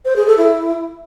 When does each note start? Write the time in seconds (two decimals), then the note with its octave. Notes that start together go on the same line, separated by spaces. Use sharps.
0.05 C5
0.16 G#4
0.27 A4
0.37 E4